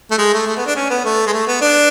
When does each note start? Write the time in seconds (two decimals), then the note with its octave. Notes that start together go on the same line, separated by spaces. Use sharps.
0.11 A3
0.18 G#3
0.33 A3
0.47 A3
0.57 B3
0.67 D4
0.76 C#4
0.90 B3
1.05 A3
1.27 G#3
1.33 A3
1.48 B3
1.62 D4